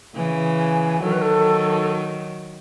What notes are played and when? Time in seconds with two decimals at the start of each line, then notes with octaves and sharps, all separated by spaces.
0.15 C#3 E3
0.59 G#5
1.02 D#3 F#3 A4
1.12 B4
1.22 A4